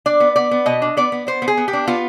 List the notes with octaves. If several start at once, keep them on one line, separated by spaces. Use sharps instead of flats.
D4 D5
B3
B3 D5
B3
B2 D#5
D4
B3 D5
B3
B3 C5
B3
G#4
B3
G4
D4
B3 F4